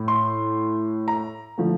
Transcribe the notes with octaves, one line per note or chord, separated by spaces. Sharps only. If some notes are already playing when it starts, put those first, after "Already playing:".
Already playing: A2 A3
C6
A#5
D3 F3 A3